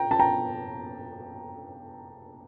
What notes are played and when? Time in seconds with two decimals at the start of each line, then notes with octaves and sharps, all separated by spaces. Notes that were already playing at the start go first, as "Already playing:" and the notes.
Already playing: G5 A#5
0.11 A5
0.20 G5 A#5